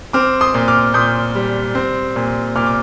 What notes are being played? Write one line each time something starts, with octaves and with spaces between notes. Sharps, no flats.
C4 D6 F6
C6 D#6
A#2
D6 F6
A#2 D#6 G6
G3
C4
A#2
A#2 D6 F6
D6